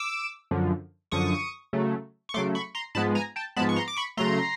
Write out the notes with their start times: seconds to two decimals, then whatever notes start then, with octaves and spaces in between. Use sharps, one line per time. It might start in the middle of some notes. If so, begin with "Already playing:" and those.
Already playing: D6 E6
0.51 F#2 D3 F3
1.12 F#2 D3 F3 C#6 D#6
1.73 C#3 F#3 A3
2.29 C#6
2.34 C#3 F#3 A3 C6 D6
2.55 B5 C#6
2.75 A#5 C6
2.95 G#2 F3 G#3 B3 A5 B5
3.15 G#5 A#5
3.36 G5 A5
3.56 G#2 F3 G#3 B3 A5 B5
3.69 C#6
3.76 A#5 C6
3.88 D6
3.97 B5 C#6
4.17 C#3 F#3 A3 A#5 C6